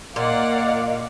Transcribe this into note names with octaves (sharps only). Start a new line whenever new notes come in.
A#2 A#3 D5 D#5 F5 F#5